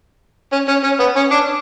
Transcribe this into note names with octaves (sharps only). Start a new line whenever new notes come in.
C#4
C#4
C#4
B3
C#4
D4